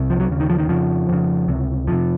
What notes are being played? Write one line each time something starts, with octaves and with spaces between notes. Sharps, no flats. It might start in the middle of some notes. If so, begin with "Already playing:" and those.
Already playing: C2 C3
F3
F#3
D#2 C#3
D#3
F3
D#3
F2 C#3 F3
F2 C#3
C#2 C3
F2 C3 F3